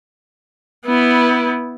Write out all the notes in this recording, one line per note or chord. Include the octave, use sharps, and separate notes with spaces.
B3 E4